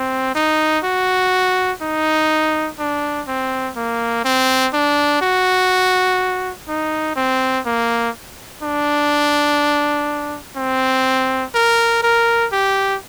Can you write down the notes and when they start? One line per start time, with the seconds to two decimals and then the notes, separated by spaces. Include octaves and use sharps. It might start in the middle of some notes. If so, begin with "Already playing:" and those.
Already playing: C4
0.35 D#4
0.85 F#4
1.82 D#4
2.79 D4
3.28 C4
3.76 A#3
4.25 C4
4.74 D4
5.22 F#4
6.69 D#4
7.16 C4
7.66 A#3
8.63 D4
10.57 C4
11.55 A#4
12.03 A#4
12.53 G4